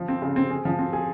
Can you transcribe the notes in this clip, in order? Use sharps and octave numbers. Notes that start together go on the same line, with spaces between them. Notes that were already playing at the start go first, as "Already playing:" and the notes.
Already playing: F3
C4
C#3
C4
G#4
F3
C4
G#4